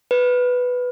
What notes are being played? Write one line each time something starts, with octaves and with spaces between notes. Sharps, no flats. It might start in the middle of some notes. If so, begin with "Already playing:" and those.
B4